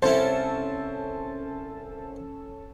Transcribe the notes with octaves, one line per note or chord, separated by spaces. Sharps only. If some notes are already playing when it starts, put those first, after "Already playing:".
C2 C#4 E4 A4 C5 A5